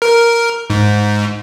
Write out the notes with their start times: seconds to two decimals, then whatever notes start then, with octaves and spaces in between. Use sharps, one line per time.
0.02 A#4
0.70 G#2